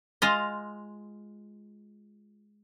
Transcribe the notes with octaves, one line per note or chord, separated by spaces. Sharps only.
G#3 F4 D#5